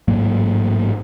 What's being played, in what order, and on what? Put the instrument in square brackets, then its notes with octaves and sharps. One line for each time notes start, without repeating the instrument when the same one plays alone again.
[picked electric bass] A1 G#2 F#3 A#3